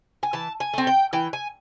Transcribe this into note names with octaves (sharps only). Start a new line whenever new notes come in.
G#5
E3 A5
G#5
A3 C4
G5
E3 G5
G#5